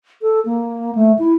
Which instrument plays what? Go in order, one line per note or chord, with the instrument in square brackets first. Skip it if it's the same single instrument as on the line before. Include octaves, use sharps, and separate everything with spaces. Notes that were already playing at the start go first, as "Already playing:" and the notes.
[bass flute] A4
A#3
A3
E4